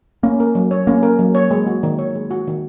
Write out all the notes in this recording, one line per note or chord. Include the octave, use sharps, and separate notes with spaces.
A#3 C#4
A#4
F#3
C#5
A#3 C#4
A#4
F#3
C#5
G#3
F#4
D#3
C#5
G#3
F#4
D#3